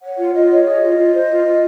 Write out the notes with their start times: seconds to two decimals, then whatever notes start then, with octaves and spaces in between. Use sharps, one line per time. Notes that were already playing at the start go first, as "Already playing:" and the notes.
0.02 C#5 F#5
0.18 F4
0.34 F4 D#5
0.50 C#5
0.65 G#4 D#5
0.81 F4
0.97 F4
1.13 C5
1.29 F4
1.44 F4